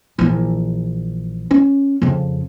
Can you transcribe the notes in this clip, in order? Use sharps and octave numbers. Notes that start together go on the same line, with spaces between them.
A#1 E3
C#4
F2 C#3